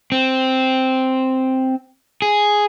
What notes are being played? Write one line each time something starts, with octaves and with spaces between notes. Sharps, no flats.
C4
G#4